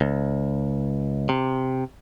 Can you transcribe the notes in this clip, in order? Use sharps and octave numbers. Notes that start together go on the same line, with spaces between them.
C#2
C3